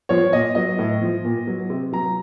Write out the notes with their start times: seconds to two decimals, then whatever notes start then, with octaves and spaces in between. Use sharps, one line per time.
0.09 F3 C#5
0.33 A#2 D#5
0.55 F#3 D#5
0.78 A2
1.01 F3
1.25 A#2
1.47 F#3
1.70 C3
1.92 F#3 A#5